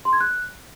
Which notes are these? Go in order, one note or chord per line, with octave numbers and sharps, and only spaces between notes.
C6
G#6
F#6